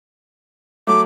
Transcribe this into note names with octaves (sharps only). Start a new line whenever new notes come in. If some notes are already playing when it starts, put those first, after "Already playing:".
F#3 A3 D6